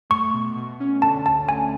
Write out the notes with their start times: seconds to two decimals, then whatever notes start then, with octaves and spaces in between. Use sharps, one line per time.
0.10 A3 C#6
0.33 B2
0.56 B2
0.80 C#4
1.02 D3 A5
1.26 D2 A5
1.48 A3 G#5